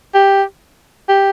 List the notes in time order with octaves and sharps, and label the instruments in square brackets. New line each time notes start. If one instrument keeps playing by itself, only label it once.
[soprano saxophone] G4
G4